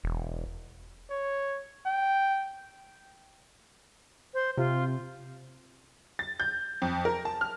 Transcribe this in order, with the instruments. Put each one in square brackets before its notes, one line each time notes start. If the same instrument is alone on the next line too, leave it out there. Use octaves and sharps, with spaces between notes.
[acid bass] E1
[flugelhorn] C#5
G5
[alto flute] C5
[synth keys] C3 [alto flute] F4
[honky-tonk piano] A6
G6
F2
A#4
A5
F6